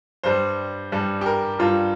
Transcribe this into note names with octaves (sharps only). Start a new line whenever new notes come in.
G2 G3 C5
G2 G3
G4
A#4
G2 G3 F4